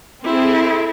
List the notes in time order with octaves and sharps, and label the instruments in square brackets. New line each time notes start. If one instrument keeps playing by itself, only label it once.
[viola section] C4 G#4 A4 [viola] E4